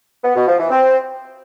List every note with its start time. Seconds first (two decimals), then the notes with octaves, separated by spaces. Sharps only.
0.24 B3
0.35 B2
0.47 F3
0.58 E3
0.70 C4